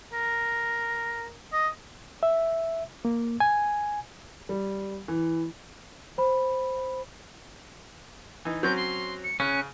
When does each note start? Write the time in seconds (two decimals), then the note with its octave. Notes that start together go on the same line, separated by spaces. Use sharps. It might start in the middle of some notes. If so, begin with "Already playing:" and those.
0.13 A#4
1.53 D#5
2.23 E5
3.05 A#3
3.40 G#5
4.49 G3
5.08 E3
6.18 C5 B5
8.45 E3 D#4
8.63 F#3 C4 C#4 G6
8.76 C6
9.24 C#7
9.40 C#3 C#4 F#6